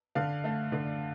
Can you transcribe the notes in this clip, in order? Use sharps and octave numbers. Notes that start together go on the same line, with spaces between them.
D3 F5
A3
D3